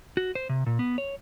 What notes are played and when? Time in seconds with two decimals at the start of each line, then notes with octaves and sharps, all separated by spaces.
0.17 F#4
0.35 C5
0.49 C3
0.66 A#2
0.79 B3
0.98 C#5